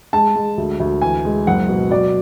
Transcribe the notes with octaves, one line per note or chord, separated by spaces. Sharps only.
G#3 A5
G#3
D2
D2
E3 G#5
G#3
F#1 F#5
B2
F#3 D5